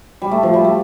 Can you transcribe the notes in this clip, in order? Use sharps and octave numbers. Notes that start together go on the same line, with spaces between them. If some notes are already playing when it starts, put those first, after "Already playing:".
G3
A3
F3
G3
A3